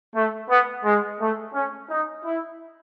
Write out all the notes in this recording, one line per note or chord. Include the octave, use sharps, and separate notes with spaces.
A3
B3
G#3
A3
C#4
D#4
E4